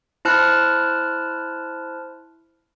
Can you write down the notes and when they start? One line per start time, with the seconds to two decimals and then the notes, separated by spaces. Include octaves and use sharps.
0.25 E4 C5 A5 F6 F#6